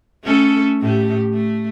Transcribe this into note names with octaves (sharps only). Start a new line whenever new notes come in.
A3 C#4 A4
A2 A3 G4
A3